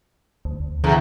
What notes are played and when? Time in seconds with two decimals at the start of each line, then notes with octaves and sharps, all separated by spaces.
0.45 D2
0.84 E2 D3